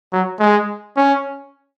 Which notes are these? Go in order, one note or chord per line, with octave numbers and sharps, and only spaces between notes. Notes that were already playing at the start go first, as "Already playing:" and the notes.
F#3
G#3
C#4